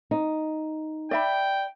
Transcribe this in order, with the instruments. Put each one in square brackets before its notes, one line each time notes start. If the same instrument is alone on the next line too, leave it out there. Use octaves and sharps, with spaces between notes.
[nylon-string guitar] D#4
[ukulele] D5 E5 B5 [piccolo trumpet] G5